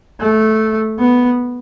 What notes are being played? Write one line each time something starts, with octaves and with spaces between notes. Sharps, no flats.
A3
B3